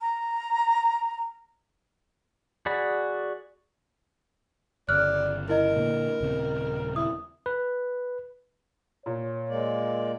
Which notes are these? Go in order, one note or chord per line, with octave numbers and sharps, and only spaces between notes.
A#5
F#4 G#4 D5 B5
G1 C#3 D5 F6 F#6
E4 A#4 D#5
A#2 D3 A#3
D#1 C#3 C4
E4 D#6
B4
A#2 C#5
G#3 A#3 D5